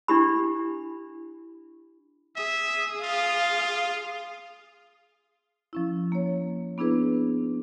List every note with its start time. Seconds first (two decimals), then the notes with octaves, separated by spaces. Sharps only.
0.08 D4 E4 G4 B5
2.36 G#4 E5 D#6
3.03 F4 F5
5.73 F3 C#4 E4
6.12 A#3 C#5
6.78 B3 D4 E4 G#4 B4